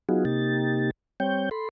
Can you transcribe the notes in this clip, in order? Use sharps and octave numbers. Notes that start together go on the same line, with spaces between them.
F#3 B3 D#4 F4 F#4 G#4
C3 A#3 D#4 G4 A6
G3 C4 C#5 G5 G6
A4 B5 C6